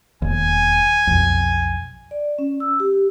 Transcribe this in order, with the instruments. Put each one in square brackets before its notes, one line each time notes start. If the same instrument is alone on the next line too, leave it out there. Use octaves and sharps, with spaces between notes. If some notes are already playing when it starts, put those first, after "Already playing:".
[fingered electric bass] E1 D#2 [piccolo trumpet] G#5
[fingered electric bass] B1 F2
[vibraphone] D5
C#4
E6
G4